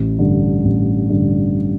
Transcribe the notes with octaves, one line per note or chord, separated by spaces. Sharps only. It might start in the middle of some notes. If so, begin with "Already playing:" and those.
Already playing: A1
G2 D3
A1
G2 D3